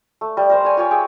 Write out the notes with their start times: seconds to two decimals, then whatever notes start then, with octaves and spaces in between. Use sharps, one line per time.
0.21 A3
0.37 G3
0.49 A#4 C5 C6
0.64 C#5 G#5
0.77 F4 G4 C#5
0.91 G#4 D5 E5 G5